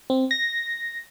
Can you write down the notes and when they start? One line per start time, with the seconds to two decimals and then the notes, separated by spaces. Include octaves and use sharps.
0.10 C4
0.31 A#6